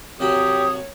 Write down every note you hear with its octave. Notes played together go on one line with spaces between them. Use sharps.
C2 F#3 G4 C#5 G5 D#6